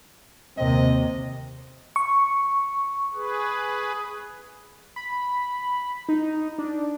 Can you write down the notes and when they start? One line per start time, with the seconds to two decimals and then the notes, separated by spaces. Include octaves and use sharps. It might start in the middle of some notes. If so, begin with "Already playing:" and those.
0.58 D#2 C3 C4 D#5
1.96 C#6
3.14 G#4 B4
4.96 B5
6.09 D#4
6.58 D4